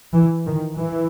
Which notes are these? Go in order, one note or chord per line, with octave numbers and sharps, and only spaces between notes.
E3
D#3
E3